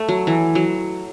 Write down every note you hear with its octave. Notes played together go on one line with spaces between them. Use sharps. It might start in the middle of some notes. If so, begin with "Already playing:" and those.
Already playing: A3
F#3
E3
F#3